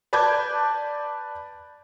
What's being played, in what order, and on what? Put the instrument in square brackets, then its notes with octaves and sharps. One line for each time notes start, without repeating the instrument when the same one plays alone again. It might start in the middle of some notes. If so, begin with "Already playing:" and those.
[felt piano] B4 D5 A5 D6 G6 G#6